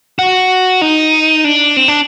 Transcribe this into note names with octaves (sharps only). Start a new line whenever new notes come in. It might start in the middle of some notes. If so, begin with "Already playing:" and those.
F#4
D#4
D4
C4
D4